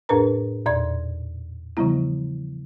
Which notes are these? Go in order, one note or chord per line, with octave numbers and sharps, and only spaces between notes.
F2 A2 D4 A#4 B4 A#5
E2 A#2 D5 C6 G#6
C#3 E3 F3 G3 B3 E4